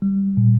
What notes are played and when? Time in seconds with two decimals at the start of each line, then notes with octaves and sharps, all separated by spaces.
0.02 G3
0.37 A#2